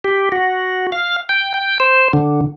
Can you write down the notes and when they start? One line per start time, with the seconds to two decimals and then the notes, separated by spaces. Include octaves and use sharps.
0.04 G4
0.32 F#4
0.92 F5
1.29 G5
1.54 G5
1.80 C5
2.13 D3